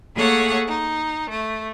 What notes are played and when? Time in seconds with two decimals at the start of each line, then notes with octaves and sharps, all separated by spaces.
0.15 A3 A#3 G#4 A4 C#5 F#5
0.67 D#4
1.30 A3